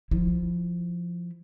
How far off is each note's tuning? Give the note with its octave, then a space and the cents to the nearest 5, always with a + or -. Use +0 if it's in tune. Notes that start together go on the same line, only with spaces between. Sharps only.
F3 -5 E4 +0